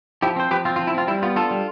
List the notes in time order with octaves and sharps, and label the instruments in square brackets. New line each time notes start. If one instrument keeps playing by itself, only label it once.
[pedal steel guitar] F3 E4 G4
C4 C5
F3 G4 B4
C4 F4
F4
F3
E4
C4 F4
G3 E4
B3 F4
D4 F4 A4
G3